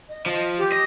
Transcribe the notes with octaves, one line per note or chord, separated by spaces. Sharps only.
D#5
F3 D#5
G4
D#5